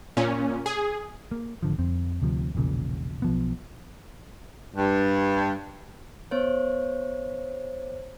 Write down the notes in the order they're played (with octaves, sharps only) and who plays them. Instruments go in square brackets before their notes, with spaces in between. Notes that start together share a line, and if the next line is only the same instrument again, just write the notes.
[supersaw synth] A#2 C#4
G#4
[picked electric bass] A#3
G#1 D3 F3
F2 C4
D2 C3 F3
E1 A#1 A#2 C#3
B1 F3 B3
[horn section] G2
[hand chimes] B3 C5 C#5